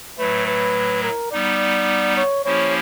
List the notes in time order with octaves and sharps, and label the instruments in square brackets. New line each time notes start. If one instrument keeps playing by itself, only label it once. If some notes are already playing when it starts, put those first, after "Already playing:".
[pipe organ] A2 F#3 A3 [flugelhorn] B4
[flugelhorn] B4
A#4
[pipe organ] G3 B3 D#4 [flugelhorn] D5
[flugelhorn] C#5
[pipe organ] F3 A#3 C#4 E4 G4 [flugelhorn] C#5